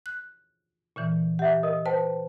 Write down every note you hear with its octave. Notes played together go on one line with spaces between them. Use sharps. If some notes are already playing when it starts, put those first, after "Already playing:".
F#6
A#2 D3 E3
G4 E5 F#5
A#4 D#5 D#6
B4 C5 G5 A5